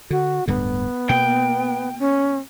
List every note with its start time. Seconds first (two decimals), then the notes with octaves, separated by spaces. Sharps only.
0.11 D3 F#4
0.48 D1 G2 D3 B3
1.09 B2 A#3 G5
1.99 C#4